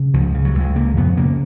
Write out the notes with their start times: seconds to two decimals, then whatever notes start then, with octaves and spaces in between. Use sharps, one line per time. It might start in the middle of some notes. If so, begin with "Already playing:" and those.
Already playing: C#3
0.14 C#2 F3
0.34 C#3
0.45 F#3
0.55 C#2
0.60 G#3
0.75 C#3 A#3
0.97 F2 B3
1.17 C#3 A#3